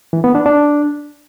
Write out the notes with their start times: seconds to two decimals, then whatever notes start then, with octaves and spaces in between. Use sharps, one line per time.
0.13 E3
0.24 B3
0.35 D4
0.46 D4